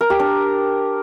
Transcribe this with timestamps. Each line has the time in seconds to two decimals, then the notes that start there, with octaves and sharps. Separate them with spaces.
0.01 A#4
0.10 G4
0.19 D4